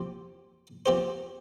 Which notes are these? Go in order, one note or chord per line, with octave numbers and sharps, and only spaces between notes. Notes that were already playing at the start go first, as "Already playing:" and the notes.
Already playing: F3 C4 G4 C5
F3 C4 G4 C5